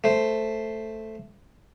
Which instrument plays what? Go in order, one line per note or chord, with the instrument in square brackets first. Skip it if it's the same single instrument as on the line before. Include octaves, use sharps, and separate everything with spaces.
[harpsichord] A3 C5